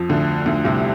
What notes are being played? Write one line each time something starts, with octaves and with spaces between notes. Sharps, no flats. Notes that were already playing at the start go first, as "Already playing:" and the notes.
Already playing: F2 F3
D2 D3
D2 D3
C2 C3